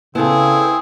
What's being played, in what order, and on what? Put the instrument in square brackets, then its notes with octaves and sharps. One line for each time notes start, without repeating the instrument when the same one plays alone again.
[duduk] C#3 [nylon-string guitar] B3 A4 [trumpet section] C4 G#4 [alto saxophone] E4